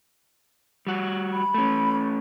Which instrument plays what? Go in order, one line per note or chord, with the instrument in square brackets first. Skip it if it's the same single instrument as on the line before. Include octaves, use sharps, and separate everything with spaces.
[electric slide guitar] G3 F#4
[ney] B5
[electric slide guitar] A3 C#4